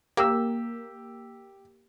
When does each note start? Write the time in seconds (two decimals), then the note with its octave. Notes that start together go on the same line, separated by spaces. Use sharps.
0.17 A#3 G4 E6